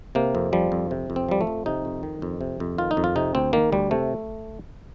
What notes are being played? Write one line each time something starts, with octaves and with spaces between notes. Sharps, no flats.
C3 A#3
F2
F3 G3
F2
C3
F2
C4
F3 G3
A3
F2
C3 D#4
F2
D#3
F2
C3
F2
D#3 F4
D#4
F2
F4
C3 D#4
D2 C4
D#3 A#3
D2 G3
C3 A3